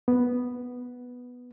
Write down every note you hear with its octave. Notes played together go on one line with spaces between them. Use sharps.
B3